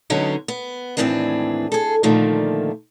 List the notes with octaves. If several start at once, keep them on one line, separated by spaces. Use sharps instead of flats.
D3 F#3 G#3 B3 C#4 D#4
B3
D#2 A2 E3 C4 D4 G#4
G#4 A4
A#2 D3 D#3 F3 A3